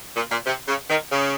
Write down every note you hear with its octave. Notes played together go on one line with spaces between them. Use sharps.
A#2
A#2
C3
C#3
D#3
C#3